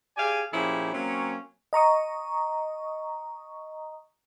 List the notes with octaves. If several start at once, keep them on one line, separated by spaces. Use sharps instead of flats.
G4 G#4 D5 F5 G#5
A#2 F3 C#4 E4 G4 G#4
F#3 A#3 C4 C#4
D#5 A#5 C#6 D#6